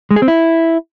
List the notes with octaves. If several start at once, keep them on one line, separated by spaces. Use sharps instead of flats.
G#3
G#4
C4
E4